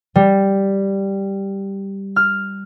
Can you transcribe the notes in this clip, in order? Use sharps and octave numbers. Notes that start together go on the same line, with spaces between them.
G3
F6